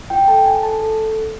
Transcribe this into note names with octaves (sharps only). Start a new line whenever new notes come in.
F4 G5
A4 A5
F4 G#5
A4 A5
A4